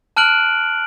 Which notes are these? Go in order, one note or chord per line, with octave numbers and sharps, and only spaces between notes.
A5 F6 F#6 D7 F#7